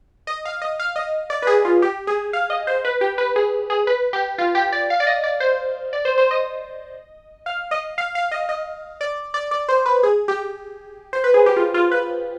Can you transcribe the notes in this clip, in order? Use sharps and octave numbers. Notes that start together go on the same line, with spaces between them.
D#5
F5
D#5
F5
D#5
D5
B4
G#4
F4
G4
G#4
F5
D#5
C5
B4
G4
B4
G#4
G#4
B4
G4
F4
G4
D5
F5
D5
D#5
D5
C5
D5
C5
C5
D#5
F5
D#5
F5
F5
D#5
D#5
D5
D5
D5
C5
B4
G#4
G4
C5
B4
G#4
G4
F4
F4
B4